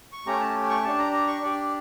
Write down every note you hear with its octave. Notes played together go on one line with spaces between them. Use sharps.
C#6
A3 C#4 G4 A#5
A5
C#6
D4 G4 A5
A#5
A#5
C#6
D4 G4 D5